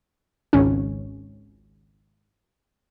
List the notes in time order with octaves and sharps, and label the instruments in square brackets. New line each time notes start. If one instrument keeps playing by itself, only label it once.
[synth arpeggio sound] G#1 C#2 C#4